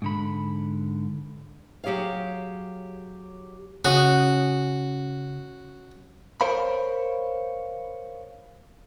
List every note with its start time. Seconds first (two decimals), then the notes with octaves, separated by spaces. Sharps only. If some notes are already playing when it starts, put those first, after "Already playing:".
0.02 G#2 D3 B5
1.84 F#3 G4 G#4 C#5 F5
3.85 C#3 C#4 F#4 D#5 F#5
6.41 A#4 C5 C#5 F5 B5